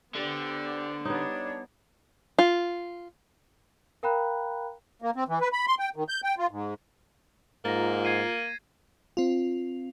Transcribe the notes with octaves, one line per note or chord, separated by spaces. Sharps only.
D3 B3 G4 C5 D5
G3 B3 D4 D#4 C#5
F4
A#4 F5 G5 A#5 B5 F#6
A#3
C4
E3
B4
B5
C6
G5
D#3
G6
G5
F4
G#2
G#2 A#3 F4 A#5 A6 A#6
G#6 C7 D#7
C4 F4